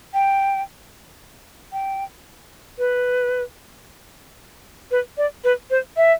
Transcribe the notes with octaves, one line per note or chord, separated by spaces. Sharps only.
G5
G5
B4
B4
D5
B4
C5
E5